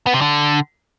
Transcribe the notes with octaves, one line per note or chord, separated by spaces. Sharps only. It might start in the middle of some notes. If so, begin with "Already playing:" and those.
B3
C3
D3